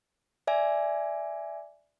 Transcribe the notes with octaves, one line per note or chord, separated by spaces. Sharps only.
D5 E5 G#5